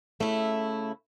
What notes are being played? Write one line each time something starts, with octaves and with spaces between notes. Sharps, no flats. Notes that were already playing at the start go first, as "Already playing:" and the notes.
C#3 A3 E4